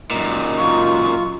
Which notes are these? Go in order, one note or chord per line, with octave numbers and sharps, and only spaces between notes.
F#2 A#2 D#4
F4 C#6